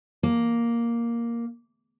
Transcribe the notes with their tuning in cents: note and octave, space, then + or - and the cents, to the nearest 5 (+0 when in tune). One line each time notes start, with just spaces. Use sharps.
A#3 +5